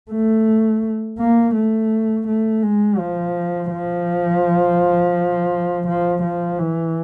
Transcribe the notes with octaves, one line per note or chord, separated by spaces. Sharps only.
A3
A#3
A3
A3
G#3
F3
F3
F3
F3
E3